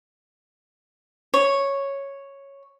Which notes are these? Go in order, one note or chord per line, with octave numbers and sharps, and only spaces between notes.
C#5